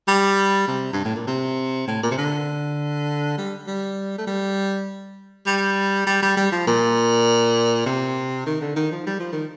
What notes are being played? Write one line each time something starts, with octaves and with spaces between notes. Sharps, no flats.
G3
C3
G2
A2
A#2
C3
A2
A#2
C3
D3
G3
G3
A3
G3
G3
G3
G3
G3
F3
A#2
C3
D#3
D3
D#3
F3
G3
F3
D#3